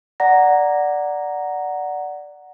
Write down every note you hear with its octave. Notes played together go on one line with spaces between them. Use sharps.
D5 F#5 A#5 A#6